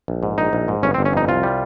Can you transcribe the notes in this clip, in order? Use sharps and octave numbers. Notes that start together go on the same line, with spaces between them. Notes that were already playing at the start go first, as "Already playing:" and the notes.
A#1
G#2
A#1 D#4
A#1
G#2
G1 C#4
C4
G1
C#4
F2 D#4
C2 F4
G3